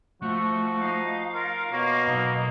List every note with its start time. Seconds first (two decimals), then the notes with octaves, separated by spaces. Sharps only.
0.22 F3 A3 F#4
0.82 D#4 F5
1.35 F4 A#4
1.72 B2 A#3 C#5
2.07 B1 D#4